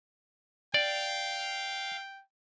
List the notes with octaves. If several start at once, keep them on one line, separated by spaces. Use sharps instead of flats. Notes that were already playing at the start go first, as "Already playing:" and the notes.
D5 F5 G5